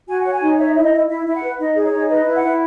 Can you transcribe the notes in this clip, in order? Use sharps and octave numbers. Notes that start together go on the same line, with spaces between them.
F#4 G#5
C#5 F#5
G#5
D#4
C#5 E5
E4 E5
D#5
E4
E4 E5
E4 E5
F#5
B4
D#4 D#5
G#4
C#5
D#4
B4 D#5
E4
F#5
E4